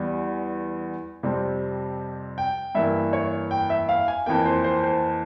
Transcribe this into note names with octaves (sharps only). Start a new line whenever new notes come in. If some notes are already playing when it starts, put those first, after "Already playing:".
Already playing: E2 E3 G3
F2 C3 G3 C4
G5
G2 E3 A#3 E5
C#5
G5
E5
F5
G#5
F2 E3 A#3 G5
C5
C5
C5